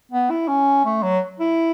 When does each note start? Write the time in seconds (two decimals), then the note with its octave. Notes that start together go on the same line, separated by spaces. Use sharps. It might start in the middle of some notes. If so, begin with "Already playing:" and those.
0.12 B3
0.30 E4
0.48 C#4
0.85 A3
1.02 F#3
1.40 E4